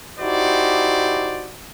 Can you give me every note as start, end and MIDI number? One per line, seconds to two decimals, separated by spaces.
0.20 1.53 63
0.20 1.53 64
0.20 1.53 66
0.20 1.53 67
0.20 1.53 72
0.20 1.53 74